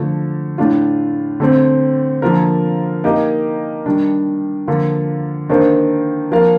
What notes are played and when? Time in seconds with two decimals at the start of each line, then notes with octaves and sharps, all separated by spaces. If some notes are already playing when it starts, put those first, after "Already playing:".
Already playing: D3 F3 A3
0.58 A2 A3 D4 F4
1.40 D3 A3 C4
2.22 D3 F3 A#3 F4 A#4
3.04 A#3 D#4 G4 A#4 D#5
3.86 D#3 G3 D4
4.67 D3 F3 A#3 F4
5.49 D#3 A#3 D4 A4 C5
6.31 F3 A#3 F4 A#4 F5